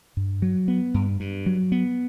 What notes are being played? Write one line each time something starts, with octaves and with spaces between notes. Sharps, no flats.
G2
F#3
B3
G2
G2
F#3
B3